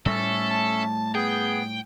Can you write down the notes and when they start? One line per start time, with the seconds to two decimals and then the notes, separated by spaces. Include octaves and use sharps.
0.06 A2 G3 A3 C#4 A4 E5
0.50 A5
1.15 B3 G#4 G5